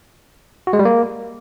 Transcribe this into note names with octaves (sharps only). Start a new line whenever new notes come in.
F#4
G#3
G3
A#3